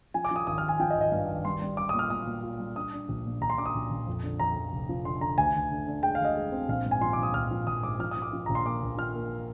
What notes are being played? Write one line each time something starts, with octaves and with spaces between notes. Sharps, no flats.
F3 G#5
D6
F3 D#6
G#1 D#6
F6
G#1
G#5
F3 G5
D#5
G#1
D#5
G2 F5
G#1
G3 C6
G3
G3 D6
A#2 D#6
F6
A#2 D#6
A#2
F4
G3
D4 D#6
D4
A#1
A#2
A#1 A#5
C6
D4 D6
D#6
A#1
A#1
F2
D3
F2 A#5
F2
F1
F3
D3 C6
D3 A#5
D2 G#5
D2
D3
D3
G#3 G5
F5
D2 D#5
G#3
C4
A#1 F5
G#2
G#5
F3 C6
D6
A#1 D#6
A#1 F6
F3
A#1 D#6
G#2 D6
F3 F6
D#6
F3
D6
F3
A#1 A#5
C6
A#3 D6
A#1
F3 F6
A#3